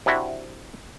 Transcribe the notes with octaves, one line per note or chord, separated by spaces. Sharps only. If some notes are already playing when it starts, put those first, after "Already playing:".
C3 D4 E4 F#4